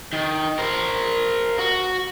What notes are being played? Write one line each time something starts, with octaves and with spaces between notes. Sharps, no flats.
D#3
A#4 C5
F#4